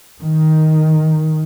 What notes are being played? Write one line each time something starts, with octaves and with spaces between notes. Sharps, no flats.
D#3